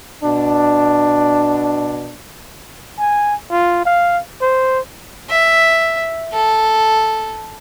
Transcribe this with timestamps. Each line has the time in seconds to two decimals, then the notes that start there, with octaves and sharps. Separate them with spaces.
0.22 B2 D4
2.99 G#5
3.51 F4
3.85 F5
4.41 C5
5.30 E5
6.33 A4